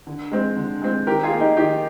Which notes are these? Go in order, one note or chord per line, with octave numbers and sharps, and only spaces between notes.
D3
G#3 C4
D3
G#3 C4
D#3 G4 A#4
F4 G#4
A#3
D#4 G4
D#3 D#4 G4